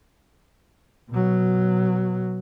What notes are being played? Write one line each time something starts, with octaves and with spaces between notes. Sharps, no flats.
B2 F#3